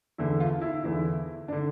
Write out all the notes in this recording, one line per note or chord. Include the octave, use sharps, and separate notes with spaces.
E2 D3 E4
F4
E4
E2 D3 E4
D4
D3